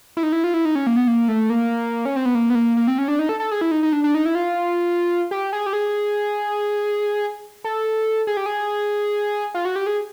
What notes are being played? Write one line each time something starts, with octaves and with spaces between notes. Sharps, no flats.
E4
D#4
E4
F4
E4
D#4
C#4
A#3
B3
A#3
A3
A#3
C#4
C4
B3
A#3
B3
A#3
A#3
C4
C#4
D4
D#4
A4
A4
G#4
E4
D#4
D#4
D4
D4
D#4
E4
F4
G4
G#4
G4
G#4
A4
G#4
G4
G#4
F4
F#4
G4
G#4